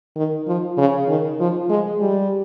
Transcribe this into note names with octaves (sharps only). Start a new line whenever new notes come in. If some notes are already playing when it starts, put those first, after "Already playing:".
D#3
F3
C#3
D#3
F3
G#3
G3